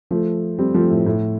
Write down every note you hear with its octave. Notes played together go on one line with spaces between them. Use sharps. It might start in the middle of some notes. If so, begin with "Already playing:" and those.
F3 A3
G3 C4
F3 A3
A2
A2